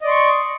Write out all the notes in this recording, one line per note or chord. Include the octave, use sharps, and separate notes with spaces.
D5 D#5 C6 C#6